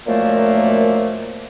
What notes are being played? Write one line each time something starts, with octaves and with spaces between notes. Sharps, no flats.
F#2 A#2 D#3 F3 A3 A#3